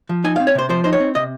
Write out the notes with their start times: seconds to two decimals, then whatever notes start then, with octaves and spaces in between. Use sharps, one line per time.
0.09 F3
0.24 D#4 G#5
0.36 F5
0.40 C4
0.47 C#5
0.55 C3 C5
0.69 F3 C5
0.84 D#4 C5
0.93 C#5
1.00 C4
1.15 C3 D#5